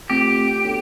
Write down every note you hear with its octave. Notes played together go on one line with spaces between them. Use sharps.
A3 C4 F4 G4
B3 D4 F#4 A4 C#5